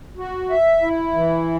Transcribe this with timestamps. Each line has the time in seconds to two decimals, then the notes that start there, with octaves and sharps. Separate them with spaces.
0.17 F#4
0.50 E5
0.82 E4
1.14 E3